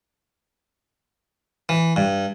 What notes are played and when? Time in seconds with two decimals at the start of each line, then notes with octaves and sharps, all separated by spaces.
1.69 E3
1.96 G2